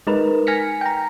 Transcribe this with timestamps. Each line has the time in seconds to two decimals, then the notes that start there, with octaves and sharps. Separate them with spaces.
0.07 G#3 D#4 A#4 B4
0.47 G#5 F6 A#6 B6 C#7
0.81 G5 A#5